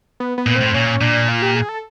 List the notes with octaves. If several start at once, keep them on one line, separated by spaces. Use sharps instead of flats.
B3
B3
A#2
C4
A2
A#2 C#4
A#2 D4
F4
G4
G#4
A4